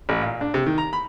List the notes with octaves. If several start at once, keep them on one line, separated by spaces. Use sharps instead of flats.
A1
A#2
D4
C3
D#3
A#5
B5